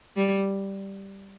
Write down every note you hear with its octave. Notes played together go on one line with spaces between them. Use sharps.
G3